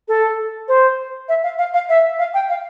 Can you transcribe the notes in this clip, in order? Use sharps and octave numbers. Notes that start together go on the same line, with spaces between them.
A4
C5
E5
F5
F5
F5
E5
F5
G5
F5